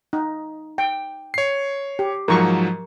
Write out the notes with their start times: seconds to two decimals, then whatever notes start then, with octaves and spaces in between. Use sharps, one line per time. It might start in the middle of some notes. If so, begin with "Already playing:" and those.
0.13 D#4
0.78 G5
1.34 C#5 C7
1.99 G4
2.28 G#2 F3 F#3 A#4 C#6